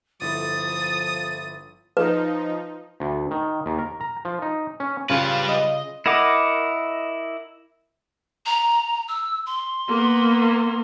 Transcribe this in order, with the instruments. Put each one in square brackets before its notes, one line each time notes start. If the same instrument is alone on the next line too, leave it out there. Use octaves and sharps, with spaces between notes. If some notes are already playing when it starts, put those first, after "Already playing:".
[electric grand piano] G1 E4 A4 [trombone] F3 [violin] D#6 [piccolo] A6
[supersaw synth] F3 D#4 [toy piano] B4
[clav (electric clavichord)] D2
D#3
D#2
A#4
A#5
F3
D#4
C#4
[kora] C#3 F4 [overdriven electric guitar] G3 B4
[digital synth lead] D#5
[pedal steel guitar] E4 A#4 D#5 F#5 D6
[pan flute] A#5
E6
C6
[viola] A#3 B3